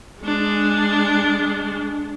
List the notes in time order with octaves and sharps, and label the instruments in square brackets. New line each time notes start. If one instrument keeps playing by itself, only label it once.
[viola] G#3 D4